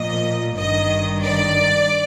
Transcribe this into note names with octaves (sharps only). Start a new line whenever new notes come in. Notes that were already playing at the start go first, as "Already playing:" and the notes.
Already playing: A#2 F3 A#3 D#5
G#1 G2 D#3 D#5
D5